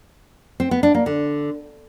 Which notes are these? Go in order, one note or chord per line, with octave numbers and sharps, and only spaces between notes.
C4
B3
D4
A#3
D3